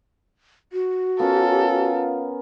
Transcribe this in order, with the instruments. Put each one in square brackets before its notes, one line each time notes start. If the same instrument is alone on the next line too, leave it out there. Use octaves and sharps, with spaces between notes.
[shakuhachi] F#4
[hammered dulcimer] B3 C#4 A#4 [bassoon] F4 [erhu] A4